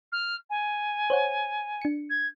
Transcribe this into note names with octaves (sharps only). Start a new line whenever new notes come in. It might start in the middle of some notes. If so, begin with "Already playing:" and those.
F6
G#5
C5 C#5 F#5
D4 C#7
G#6